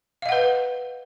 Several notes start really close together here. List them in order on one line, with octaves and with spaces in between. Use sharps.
F5 D#5 F#5 B4